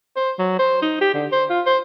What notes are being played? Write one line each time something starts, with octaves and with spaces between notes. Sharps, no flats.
C5
F#3
C5
D#4
G4
D3
C5
F4
C5